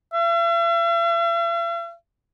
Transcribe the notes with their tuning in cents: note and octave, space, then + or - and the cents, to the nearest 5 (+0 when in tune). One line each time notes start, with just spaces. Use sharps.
E5 +45